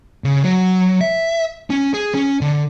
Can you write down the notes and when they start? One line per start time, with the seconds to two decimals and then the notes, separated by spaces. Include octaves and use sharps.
0.24 C#3
0.43 F#3
1.01 E5
1.70 C#4
1.94 G#4
2.14 C#4
2.41 D3